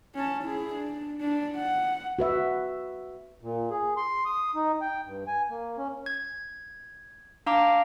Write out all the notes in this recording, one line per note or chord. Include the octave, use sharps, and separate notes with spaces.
C#4 A5
E4 G#4
D4
D4
F#5
F#4 B4 E5
A#2
G#4
C6
D#6
D#4
G5
G2
G#5
A#3
C#4
G#6
D4 F5 A#5 D6